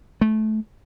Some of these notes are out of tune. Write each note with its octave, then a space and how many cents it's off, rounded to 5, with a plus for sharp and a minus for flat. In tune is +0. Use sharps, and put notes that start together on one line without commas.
A3 -20